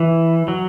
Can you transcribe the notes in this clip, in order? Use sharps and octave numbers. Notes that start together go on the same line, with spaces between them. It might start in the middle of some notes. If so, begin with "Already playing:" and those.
Already playing: E3
F#3